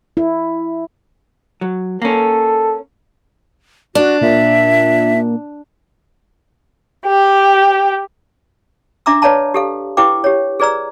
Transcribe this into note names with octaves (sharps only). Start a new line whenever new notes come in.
E4
F#3
A#3 C#4 A4
D4 F#4
A#2 E5
G4
D4 E5 A#5 D6 E6
B4 C#5 D5 F5 A5 A#5
G4 A4 F5
E4 G4 B4 F5 G5 D6
G4 C#5
G#4 B4 D5 A#5 E6